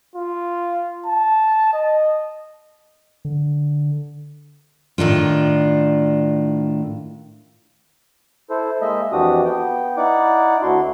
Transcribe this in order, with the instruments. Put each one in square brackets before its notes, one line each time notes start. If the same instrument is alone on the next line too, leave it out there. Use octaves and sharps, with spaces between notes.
[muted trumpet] F4
A5
D#5
[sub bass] D3
[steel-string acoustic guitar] A2 D#3 D4 F4
[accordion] E4 A4 C5
G#3 A#3 D#5 E5
F2 E3 D4 F#4 G4 D#6
B3 G5
D#4 E4 D5 F#5 D6
D2 D4 E4 F#4 C6